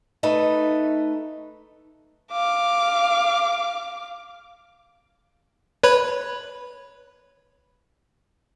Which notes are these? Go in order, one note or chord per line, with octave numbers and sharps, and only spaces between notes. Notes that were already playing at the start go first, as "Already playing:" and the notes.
A3 D#4 B4
F5 D6
B4 C#5 B5